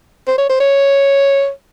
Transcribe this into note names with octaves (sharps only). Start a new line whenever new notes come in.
C5
C#5
C5
C#5